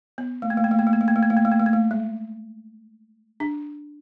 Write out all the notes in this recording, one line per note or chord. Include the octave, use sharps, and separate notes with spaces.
B3
A3
A#3
A3
A#3
A3
A#3
A3
A#3
A3
A#3
A3
A#3
A3
A#3
A3
A#3
A3
A#3
A3
G#3
D4